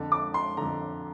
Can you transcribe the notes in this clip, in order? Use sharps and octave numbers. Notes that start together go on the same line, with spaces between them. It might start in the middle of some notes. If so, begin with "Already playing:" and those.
Already playing: F2 D3
D6
C6
F2 D3 A#5